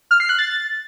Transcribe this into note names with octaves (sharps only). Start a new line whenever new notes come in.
F6
C7
F#6
A6